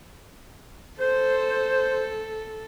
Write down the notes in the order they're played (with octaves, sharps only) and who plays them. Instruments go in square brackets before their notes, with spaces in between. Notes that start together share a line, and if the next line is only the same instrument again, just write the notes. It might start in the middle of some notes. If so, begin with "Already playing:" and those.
[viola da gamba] A4 [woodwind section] C5